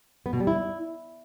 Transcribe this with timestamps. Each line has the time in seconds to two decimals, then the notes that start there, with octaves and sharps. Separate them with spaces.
0.26 B3
0.33 B2
0.40 G3
0.47 E4